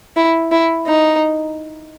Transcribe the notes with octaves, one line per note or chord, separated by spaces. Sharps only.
E4
E4
D#4